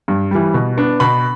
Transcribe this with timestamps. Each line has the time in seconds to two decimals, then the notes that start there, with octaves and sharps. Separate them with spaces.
0.08 G2
0.31 E3 G3
0.54 B2
0.77 B3 D4
1.00 B2 B5